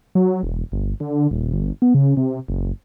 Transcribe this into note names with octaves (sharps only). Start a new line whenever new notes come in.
F#3
E1
G1
D3
D#1
G1
B3
C#3
C3
F#1